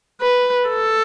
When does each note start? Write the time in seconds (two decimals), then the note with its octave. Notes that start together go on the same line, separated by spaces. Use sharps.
0.22 B4
0.69 A4